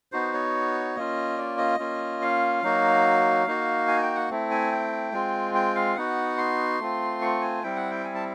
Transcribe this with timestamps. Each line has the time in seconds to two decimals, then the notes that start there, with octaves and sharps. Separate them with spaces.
0.12 B3 D#4 F#4 C5
0.34 C#5
0.96 A#3 C#4 F4 D#5
1.38 D5
1.58 D#5
1.79 A#3 C#4 F4
2.22 F5
2.63 F#3 A#3 D#4 F#4
3.47 A#3 D#4 F#4
3.88 G#5
4.02 G5
4.15 F#5
4.30 A3 C4 E4
4.51 G#5
4.72 G5
5.12 G#3 C4 F4
5.55 G5
5.75 F5
5.96 B3 D#4 F#4 F#5
6.38 C6
6.80 A3 C4 F4
7.22 C#6
7.42 G#5
7.63 G3 C4 E4 G5
7.76 F#5
7.91 G5
8.04 G#5
8.15 A5